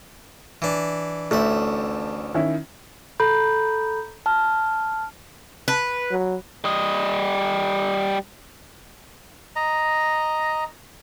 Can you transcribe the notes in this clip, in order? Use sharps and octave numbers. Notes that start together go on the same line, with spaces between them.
E3 D4
A1 D2 A3 E5
D#3 C#4 E4
A4 A#5 B5 G6
A5 F6
B4
F#3
G3 D#5
D#5 A#5